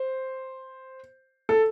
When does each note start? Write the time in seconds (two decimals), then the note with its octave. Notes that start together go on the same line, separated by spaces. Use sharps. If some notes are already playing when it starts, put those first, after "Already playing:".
Already playing: C5
1.49 A4